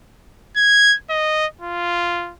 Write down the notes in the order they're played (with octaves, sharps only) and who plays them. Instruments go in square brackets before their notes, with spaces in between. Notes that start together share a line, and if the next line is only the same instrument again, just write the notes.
[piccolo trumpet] G#6
D#5
F4